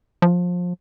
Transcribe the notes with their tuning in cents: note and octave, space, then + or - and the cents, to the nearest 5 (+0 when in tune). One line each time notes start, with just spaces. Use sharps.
F3 +25